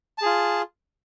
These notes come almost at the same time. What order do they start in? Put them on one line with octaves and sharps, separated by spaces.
A5 G#4 F4